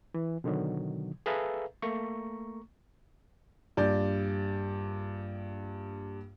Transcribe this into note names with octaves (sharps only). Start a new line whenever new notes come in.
E3
B2 D3 D#3 F#3
G#4 A4 B4 E5 F5 A#5
A3 A#3 A#5 C#6
A#1 G2 D5 G6